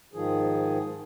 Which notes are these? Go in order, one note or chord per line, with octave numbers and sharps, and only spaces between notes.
G#2 D#3 F3 G#4